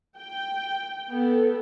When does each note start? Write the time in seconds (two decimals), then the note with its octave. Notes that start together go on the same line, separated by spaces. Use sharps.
0.17 G5
1.10 B3 A4